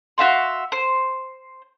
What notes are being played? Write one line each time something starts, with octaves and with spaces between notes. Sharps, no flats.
F#4 E5 F5 C6
C5